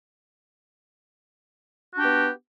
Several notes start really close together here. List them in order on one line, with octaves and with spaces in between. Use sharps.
F#4 D4 G4 B3